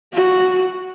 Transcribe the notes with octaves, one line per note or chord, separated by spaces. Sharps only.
F#4